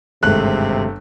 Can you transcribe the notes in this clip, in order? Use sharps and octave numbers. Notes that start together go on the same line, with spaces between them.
G1 D#2 G#2 C3 A3 F#6